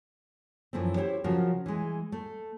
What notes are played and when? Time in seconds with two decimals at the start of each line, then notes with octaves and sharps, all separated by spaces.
0.73 F#2 E3 F3 A3 C4
0.96 E4 G4 C5 C#5
1.24 C#3 F3 F#3 C4 F#4 A#4
1.66 E3 G#3
2.12 A3